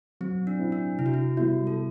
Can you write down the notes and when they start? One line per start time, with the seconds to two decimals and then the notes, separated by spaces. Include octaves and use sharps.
0.21 F#3 C4
0.47 D4
0.60 C4 E4
0.72 D4
0.99 C3 E4
1.06 F#4
1.14 E4
1.37 G3 B3 E4 F#4
1.67 A4